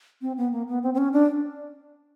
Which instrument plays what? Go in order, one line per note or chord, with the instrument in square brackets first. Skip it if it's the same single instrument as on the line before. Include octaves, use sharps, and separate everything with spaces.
[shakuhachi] C4
B3
A#3
B3
C4
C4
C#4
D4